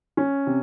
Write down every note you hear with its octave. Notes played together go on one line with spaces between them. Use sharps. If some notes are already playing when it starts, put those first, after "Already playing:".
C#4
C3